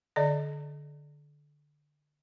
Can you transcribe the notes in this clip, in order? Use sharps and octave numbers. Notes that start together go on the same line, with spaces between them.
D3 D5 D#5